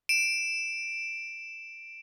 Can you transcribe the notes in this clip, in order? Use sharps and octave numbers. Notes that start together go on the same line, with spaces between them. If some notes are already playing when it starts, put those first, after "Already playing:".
D7 E7